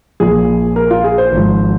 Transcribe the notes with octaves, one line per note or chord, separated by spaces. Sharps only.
A#1 A#2 F3 G#4
A#4
F4
G#4
C5
G#1 G#2 F3